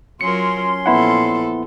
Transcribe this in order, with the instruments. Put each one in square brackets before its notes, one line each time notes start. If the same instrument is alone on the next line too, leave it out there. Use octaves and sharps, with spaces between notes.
[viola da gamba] F#3 F4 A#4 [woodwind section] C#4 C6 [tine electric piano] C#7
[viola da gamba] A#2 F3 A4 [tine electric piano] B3 E4 F#5